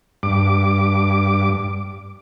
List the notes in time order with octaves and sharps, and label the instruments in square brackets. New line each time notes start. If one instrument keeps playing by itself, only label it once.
[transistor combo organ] G2 D6